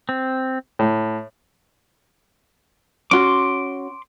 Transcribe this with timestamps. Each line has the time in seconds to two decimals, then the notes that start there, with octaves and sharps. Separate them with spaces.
0.09 C4
0.79 A2
3.11 C#4 F#4 C6 D6